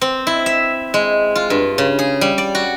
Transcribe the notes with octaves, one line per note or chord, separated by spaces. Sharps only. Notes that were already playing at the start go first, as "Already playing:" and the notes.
C4
E4
E5
G#3
F4
G2
C#3
G#4
G3
D5
F#4